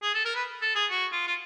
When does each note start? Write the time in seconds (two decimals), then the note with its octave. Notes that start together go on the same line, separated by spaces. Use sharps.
0.03 G#4
0.14 A4
0.25 A#4
0.35 B4
0.61 A4
0.75 G#4
0.90 F#4
1.12 F4
1.27 F4